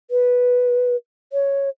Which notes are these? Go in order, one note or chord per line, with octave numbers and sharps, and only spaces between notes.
B4
C#5